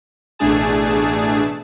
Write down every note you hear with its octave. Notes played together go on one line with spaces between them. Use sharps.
A1 B2 A3 D4 G#4 A5